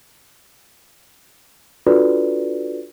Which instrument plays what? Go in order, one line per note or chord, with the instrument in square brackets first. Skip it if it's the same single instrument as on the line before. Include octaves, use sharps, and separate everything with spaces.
[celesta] D4 F4 F#4 A4 B4 D5